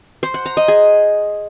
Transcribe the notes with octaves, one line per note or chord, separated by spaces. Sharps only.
C5
F#5
A#5
D#5
G#4